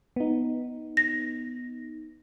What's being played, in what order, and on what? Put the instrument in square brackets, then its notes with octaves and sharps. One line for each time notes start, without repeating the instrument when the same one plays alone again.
[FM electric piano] B3 D#4
[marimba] A#6